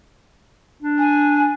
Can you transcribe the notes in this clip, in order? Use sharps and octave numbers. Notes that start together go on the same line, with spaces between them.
D4
G#5